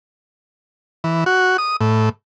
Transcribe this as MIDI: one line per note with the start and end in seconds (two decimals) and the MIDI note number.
1.04 1.24 52
1.26 1.57 66
1.58 1.76 87
1.81 2.09 45